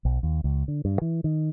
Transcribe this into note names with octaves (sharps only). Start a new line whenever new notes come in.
B1
D#2
C#2
D3
G2
E3
D#3